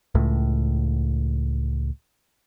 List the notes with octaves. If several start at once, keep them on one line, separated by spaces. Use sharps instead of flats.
C#2 A2